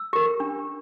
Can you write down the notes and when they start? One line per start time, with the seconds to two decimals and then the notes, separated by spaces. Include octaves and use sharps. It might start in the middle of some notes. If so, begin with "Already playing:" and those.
Already playing: E6
0.13 G4 A#4
0.40 D4